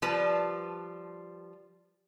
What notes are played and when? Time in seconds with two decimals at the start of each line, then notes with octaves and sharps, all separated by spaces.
0.02 F3 G3 B4 A5